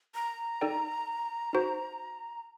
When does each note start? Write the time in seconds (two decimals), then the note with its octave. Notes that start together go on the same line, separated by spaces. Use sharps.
0.15 A#5
0.61 D#4 A4 D5 G5
1.53 D#4 F#4 C5